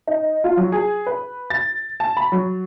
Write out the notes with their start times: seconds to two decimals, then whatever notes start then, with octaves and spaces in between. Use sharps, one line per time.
0.07 D#4
0.44 F4
0.57 F#3
0.72 G#4
1.07 B4
1.50 A6
2.00 A5
2.17 B5
2.32 F#3